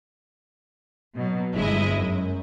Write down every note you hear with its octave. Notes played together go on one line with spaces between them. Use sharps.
B2 F#3
G1 G#3 E4 D#5
F#2